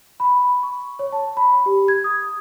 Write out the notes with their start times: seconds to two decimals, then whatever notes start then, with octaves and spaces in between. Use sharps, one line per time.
0.20 B5
0.63 C#6
0.99 C#5
1.12 A5
1.37 B5
1.66 G4
1.88 G#6
2.04 D#6